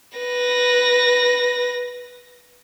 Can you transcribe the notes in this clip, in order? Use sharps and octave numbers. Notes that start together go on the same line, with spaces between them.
B4 A#6